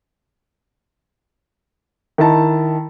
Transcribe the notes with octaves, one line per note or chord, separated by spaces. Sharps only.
D#3 E4 A5